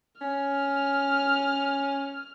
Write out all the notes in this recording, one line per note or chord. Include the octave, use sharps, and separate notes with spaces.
C#4 F6